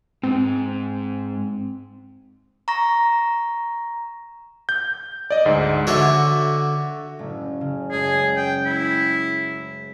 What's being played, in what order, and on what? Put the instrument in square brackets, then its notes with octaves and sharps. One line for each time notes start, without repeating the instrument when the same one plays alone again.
[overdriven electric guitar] G#2 [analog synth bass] C4
[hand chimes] A#5 C#6 A#6
[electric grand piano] G6
D5 D#5
D2 G#2
[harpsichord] D3 A4 C#5 [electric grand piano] F#4 E5
[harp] F#1 A2 A3
C#3
[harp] F#2 G#3 A3 [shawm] G#4
[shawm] G5
E4